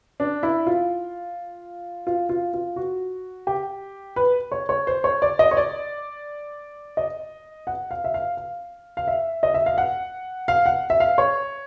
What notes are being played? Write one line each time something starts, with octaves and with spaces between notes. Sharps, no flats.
D4
E4
F4
F4
F4
F4
F#4
G4
B4
C#5
C#5
C5
C#5
D5
D#5
C#5
D5
D#5
F#5
F5
E5
F5
F5
F5
E5
D#5
E5
F5
F#5
F5
F#5
E5
F5
C#5